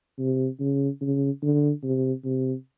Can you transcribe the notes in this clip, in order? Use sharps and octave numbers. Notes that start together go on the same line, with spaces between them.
C3
C#3
C#3
D3
C3
C3